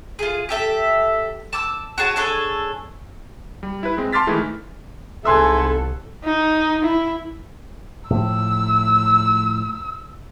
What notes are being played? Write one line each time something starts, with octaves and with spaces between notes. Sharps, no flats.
F4 G#4
G4 A4 E5
A5 D6 E6
F#4 G#4 C#5 A5
D4 G#4 A4 C#5
G3
E4 B4
G#3 C4
A5 C6 D6 F6 A6 B6
D#3 E3 G#3 A3 E4
C2 G#2 A4 B4 E5 G#5 C6 E6
D#4
E4
A2 F3 E6